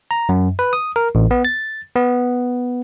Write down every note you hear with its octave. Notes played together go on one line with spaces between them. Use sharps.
A#5
F#2
B4
D#6
A#4
A1
B3
A6
B3